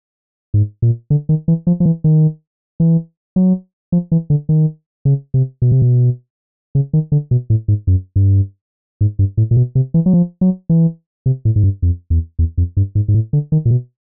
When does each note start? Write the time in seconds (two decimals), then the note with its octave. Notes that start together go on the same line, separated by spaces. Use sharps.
0.54 G#2
0.82 A#2
1.10 D3
1.29 D#3
1.48 E3
1.67 F3
1.80 F3
1.86 E3
2.04 D#3
2.80 E3
3.36 F#3
3.92 F3
4.12 E3
4.30 D3
4.49 D#3
5.05 C#3
5.34 C3
5.62 B2
5.72 C3
5.82 B2
6.75 C#3
6.93 D#3
7.12 D3
7.31 B2
7.50 A2
7.68 G#2
7.87 F#2
8.16 G2
9.01 G#2
9.19 G2
9.37 A2
9.51 A#2
9.57 B2
9.75 C3
9.94 E3
10.06 F#3
10.14 F3
10.41 F#3
10.69 E3
11.26 C3
11.45 A2
11.56 G#2
11.64 G2
11.82 F2
12.10 E2
12.39 E2
12.58 F2
12.77 G2
12.95 G#2
13.08 G#2
13.14 A2
13.33 D3
13.52 D#3
13.65 A#2
13.71 B2